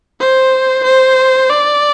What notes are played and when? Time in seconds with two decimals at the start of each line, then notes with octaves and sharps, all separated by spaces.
0.21 C5
0.84 C5
1.49 D5